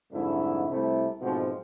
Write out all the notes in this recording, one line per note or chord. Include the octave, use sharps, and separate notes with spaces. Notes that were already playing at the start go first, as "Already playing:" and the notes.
F2 G#2 D3 G3 A3 E4
C2 C3 A3 E4
G#2 B2 F3 F#3 A3 C4